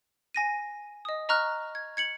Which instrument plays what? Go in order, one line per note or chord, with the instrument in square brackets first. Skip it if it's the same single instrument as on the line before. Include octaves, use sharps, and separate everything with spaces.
[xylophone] G#5 A#6 D#7
D#5 D#6
D#5 A#5 C#6 F6 F#6
G#6
G#6 C#7 F#7